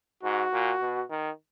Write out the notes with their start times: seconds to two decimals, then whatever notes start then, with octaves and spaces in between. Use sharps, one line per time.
0.23 G#2 F#4
0.53 A#2
0.81 B2
1.10 D#3